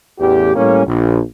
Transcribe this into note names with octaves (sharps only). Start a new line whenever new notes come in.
A1 E2 G4
A2 G3 A#3 C#4
A#1